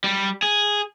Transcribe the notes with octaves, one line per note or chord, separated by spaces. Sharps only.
G3
G#4